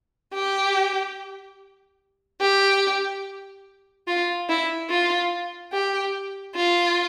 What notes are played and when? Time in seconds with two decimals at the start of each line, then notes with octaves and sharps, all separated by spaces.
0.34 G4
2.41 G4
4.08 F4
4.49 E4
4.90 F4
5.73 G4
6.56 F4